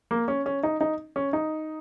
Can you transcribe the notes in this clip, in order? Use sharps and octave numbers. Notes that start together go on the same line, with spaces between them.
A#3
C#4
C#4
D#4
D#4
C#4
D#4